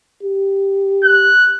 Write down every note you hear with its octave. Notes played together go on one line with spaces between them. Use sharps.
G4
F#6